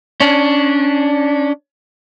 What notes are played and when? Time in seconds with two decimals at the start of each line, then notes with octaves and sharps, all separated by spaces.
0.20 C#4 D4